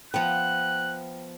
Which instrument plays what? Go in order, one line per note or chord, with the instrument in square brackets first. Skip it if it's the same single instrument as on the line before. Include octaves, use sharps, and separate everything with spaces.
[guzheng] F3 B3 [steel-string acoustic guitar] G5 [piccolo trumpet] F#6